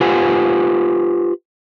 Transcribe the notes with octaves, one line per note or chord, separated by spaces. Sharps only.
F4 G4 B4 C5 F#5 G#5